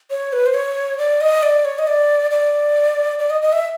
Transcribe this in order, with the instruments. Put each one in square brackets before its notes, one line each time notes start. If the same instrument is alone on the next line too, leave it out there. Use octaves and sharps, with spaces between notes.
[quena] C#5
B4
C5
C#5
D5
D#5
D5
C#5
D#5
D5
D5
D5
D#5
D#5
E5